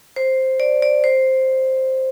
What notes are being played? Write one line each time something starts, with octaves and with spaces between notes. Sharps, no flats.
C5
D5
D5
C5